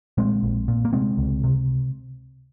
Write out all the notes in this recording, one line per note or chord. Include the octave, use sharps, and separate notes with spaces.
A#2 G#3 C4
A#1
A#2
A#3
C3 G#3 C4
C#2
C3